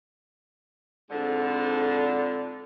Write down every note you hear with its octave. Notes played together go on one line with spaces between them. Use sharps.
F2 G#2 D3